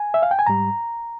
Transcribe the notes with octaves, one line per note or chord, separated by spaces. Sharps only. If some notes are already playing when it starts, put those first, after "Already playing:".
Already playing: G#5
E5
F5
G5
G#5
G#2 G3 A#5